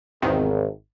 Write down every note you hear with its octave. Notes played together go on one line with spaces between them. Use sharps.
G#1 E2 C3 D#3